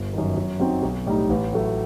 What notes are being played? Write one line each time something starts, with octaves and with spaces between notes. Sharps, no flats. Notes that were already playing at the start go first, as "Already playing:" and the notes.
Already playing: G1
F#2 D#3
F#2
F#3 C4 D#4
B1
A2 G3 D#4
A1
A2 F#3 A3